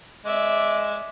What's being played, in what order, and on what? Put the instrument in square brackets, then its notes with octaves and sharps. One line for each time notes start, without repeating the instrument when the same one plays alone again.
[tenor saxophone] G#3 [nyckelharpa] D5 E5